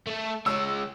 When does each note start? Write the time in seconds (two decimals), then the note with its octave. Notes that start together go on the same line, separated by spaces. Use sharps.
0.07 A3 A4
0.46 G#3 C#5 E6